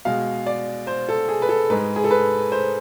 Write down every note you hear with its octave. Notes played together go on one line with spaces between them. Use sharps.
B2 G#3 F5
D5
C5
A4
G#4
B4
A4
G#2 G#3 B4
G#4
A4
B4
C5